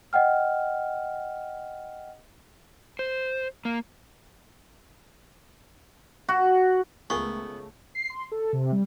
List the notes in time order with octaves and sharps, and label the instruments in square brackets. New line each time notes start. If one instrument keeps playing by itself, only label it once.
[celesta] D#5 F#5 G5 F6
[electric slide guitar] C5
A#3
[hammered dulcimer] F#4
[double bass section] C#2 A3 [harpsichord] B3 [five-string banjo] F4 G#4 A#4 [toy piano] C#6
[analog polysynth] C7
C6
A4
C3
G3